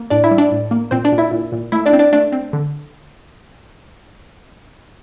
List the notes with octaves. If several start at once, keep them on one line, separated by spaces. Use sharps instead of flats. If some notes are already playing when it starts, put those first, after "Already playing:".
Already playing: A#3
A2 D4 D5
E4 E5
G3
D4 D5
A2
A#3
A#2 C4 C5
D4 D5
A#2
E4 E5
A#2
A#2
A3 E4 E5
D4 D5
C4
D4 D5
A3 D4 D5
C4
D3